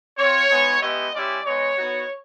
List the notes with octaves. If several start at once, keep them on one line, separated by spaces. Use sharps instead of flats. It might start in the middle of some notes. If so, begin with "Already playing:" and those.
C4 F4 C#5
G#3 B3 D#4
G#3 B3 E4 G4 D#5
G#3 C#4 E4 G4 D5
G#3 B3 D#4 C#5
B3 D#4 F#4